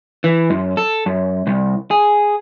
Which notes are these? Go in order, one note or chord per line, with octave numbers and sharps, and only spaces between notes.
E3
F#2
A4
F#2
C2
G#4